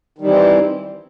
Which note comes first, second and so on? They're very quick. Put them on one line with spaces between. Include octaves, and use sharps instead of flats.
D#3 G3 E3 C4